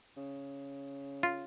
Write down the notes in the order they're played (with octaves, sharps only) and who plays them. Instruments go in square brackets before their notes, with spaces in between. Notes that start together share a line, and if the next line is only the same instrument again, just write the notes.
[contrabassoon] C#3
[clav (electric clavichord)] F4